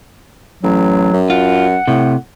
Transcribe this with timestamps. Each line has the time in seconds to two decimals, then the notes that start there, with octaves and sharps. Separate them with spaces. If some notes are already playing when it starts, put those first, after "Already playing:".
0.63 A1 F#3
1.13 F#2
1.30 F4 F#5
1.87 A2 C3